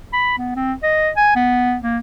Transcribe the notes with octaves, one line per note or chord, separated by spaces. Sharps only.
B5
B3
C4
D#5
G#5
B3
A#3